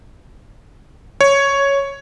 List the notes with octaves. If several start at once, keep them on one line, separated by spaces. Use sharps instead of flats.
C#5